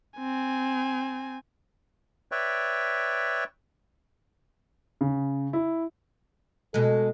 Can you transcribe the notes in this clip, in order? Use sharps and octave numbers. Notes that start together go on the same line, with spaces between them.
C4 G#5
B4 C#5 D5 E5 G5
C#3
E4
B2 G#3 A4